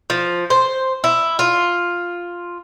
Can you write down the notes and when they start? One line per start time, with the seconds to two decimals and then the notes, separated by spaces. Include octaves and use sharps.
0.10 F3
0.50 C5
1.04 E4
1.39 F4